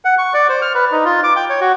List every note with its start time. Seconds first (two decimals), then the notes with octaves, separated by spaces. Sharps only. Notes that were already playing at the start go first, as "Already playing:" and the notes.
0.05 F#5
0.18 C#6
0.34 D5
0.49 C5
0.62 F6
0.75 B4
0.92 D#4
1.05 F4
1.24 D6
1.36 G5
1.50 C#5
1.61 F#4